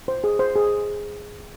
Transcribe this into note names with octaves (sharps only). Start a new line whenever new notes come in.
C5
G#4
C5
G#4